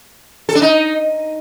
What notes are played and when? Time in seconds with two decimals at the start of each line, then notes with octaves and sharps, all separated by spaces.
0.49 A4
0.55 D4
0.62 D#4